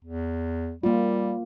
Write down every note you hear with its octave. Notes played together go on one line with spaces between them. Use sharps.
E2
G3 A#3 F4